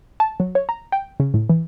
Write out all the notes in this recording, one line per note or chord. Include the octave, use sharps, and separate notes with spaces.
A5
F#3
C#5
A#5
G5
C#3
A2
E3